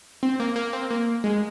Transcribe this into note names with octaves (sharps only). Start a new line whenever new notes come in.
C4
A#3
A#3
C4
A#3
G#3